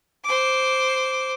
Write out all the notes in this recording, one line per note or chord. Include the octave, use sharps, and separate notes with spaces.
C5 D6